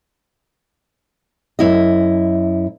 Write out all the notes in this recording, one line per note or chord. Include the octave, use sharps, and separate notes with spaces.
F#2 E4 D#5